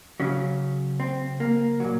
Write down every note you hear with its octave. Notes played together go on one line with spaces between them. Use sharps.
C#3 F#3 C#4
C4
A#3
A#2 F#3